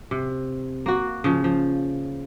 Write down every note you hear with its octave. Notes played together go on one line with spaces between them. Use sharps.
C3
A#3 F#4
C#3 F3
F3